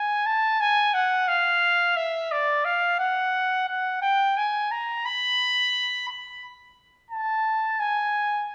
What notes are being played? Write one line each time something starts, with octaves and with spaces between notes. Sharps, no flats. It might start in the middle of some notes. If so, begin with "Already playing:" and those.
Already playing: G#5
A5
G#5
F#5
F5
E5
D5
F5
F#5
F#5
G5
G#5
A#5
B5
B5
A5
G#5